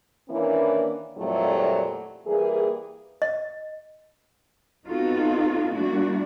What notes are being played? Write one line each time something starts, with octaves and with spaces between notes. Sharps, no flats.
D#3 E3 A#3 C#4 D4 E4
F2 A#2 F#3 G3 A3 E4
E3 G3 A#3 G#4
D#5
B3 C4 D#4 F4 F#4 A4
G3 A#3 D4 E4 F#4